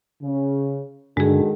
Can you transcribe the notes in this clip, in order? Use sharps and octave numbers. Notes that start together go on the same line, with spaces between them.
C#3
G2 D3 D#3 G#3 D4 F#4 G#4 A4